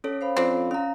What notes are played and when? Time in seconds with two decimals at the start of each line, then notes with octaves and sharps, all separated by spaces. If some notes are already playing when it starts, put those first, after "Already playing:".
0.04 C#4 A4 C#5
0.21 C5 F5 B5
0.37 F2 C4 D4
0.71 C#4 F5 A#5